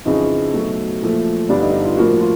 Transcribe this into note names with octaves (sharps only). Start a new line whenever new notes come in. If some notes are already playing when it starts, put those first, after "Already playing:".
F2 C#3 E3 D#4
B2 F#3 A3
A#2 F3 A3
G2 D3 G3 B3 D4
D#4
D#4
F4
A2 F3 A#3 F#4
F4